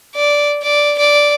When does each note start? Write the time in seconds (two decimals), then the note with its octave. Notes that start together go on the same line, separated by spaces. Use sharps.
0.16 D5
0.62 D5
0.98 D5